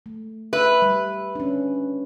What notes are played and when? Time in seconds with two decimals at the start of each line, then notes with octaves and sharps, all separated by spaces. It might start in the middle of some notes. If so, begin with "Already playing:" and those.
0.06 A3
0.53 B4 E5
0.82 G3
1.35 C#4 D4